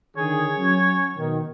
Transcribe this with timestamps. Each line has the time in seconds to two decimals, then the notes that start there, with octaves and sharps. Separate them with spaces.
0.17 D3 D#3 G#4 C#5
0.57 F#3 C#4
1.17 B2 D#3